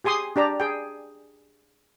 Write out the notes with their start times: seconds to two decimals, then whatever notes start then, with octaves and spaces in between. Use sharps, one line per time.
0.04 G4 G#4 G#5 C6 D#6
0.36 D4 G4 D5 A#5
0.60 G#4 G5